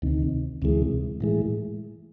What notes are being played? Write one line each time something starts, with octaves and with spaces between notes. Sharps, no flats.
D2 C3 D#3
D2 C3 E3 G#3
A2 E3 G#3